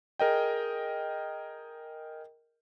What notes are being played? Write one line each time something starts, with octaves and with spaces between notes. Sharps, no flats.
G#4 A#4 D#5 G5